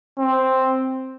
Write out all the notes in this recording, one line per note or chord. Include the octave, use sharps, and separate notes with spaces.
C4